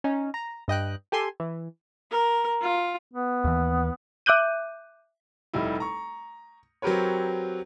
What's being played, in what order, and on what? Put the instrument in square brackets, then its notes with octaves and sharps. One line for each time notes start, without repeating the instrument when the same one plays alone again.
[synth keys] C#4 D#4
A#5
G2 D#5 G5 F#6
G4 A4 G#5 C6
E3
[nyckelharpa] A#4
F4
[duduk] B3
[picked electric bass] D#2 E3
[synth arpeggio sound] E5 D6 F#6 G6 D#7
[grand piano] F1 G3 D#4 E4
A#5 C#6
F#3 C4 G4 A#4 B4 C#5